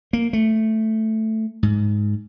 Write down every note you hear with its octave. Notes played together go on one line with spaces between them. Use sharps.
A#3
A3
G#2